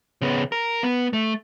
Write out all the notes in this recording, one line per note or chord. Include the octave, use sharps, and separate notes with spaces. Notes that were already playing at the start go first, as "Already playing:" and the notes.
C#3 B3
A#4
B3
A3